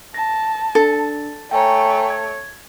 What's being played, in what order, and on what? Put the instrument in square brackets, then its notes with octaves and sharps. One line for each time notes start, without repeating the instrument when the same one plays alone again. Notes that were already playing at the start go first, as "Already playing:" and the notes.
[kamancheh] A5 [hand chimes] A#6
[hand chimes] D4 [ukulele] A4
[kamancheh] A3 C#5 [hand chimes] G5 G#5 A#5
[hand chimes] G#6